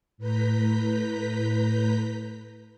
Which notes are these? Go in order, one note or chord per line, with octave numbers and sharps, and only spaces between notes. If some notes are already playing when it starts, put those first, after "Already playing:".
A2 B4 A#5 G6 B6